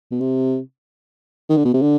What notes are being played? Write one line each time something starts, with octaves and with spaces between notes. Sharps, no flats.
B2
C3
D#3
D3
B2
C3
D3